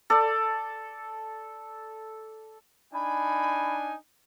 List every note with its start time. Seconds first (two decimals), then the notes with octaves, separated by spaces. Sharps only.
0.10 A4 D5
2.94 D4 D#4 G#5 B5